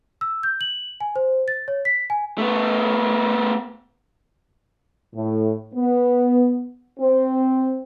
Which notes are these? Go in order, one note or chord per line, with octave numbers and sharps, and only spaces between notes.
E6
G6
F#7
G#5
C5
A6
C#5
B6
G#5
A3 B3
A2
B3
C4